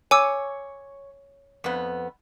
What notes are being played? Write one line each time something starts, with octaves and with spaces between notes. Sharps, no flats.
C#5 G#5 D6 E6
F2 B3